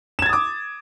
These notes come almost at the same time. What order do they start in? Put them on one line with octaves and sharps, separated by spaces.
E7 G#6 A6 D#6 D6